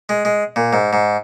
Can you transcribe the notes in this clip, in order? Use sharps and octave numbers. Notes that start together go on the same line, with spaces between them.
G#3
G#3
A#2
G#2
G#2